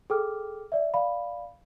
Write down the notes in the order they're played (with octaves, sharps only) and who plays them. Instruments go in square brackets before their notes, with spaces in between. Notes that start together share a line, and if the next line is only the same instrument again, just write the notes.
[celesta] G#4 A4 G5 D6 F6
D5 E5
D5 F5 B5